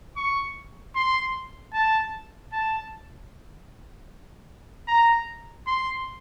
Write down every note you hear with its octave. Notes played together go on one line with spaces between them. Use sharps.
C#6
C6
A5
A5
A#5
C6